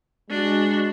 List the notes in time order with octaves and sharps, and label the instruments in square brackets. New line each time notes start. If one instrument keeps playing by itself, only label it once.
[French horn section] G#3 [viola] D4 F#4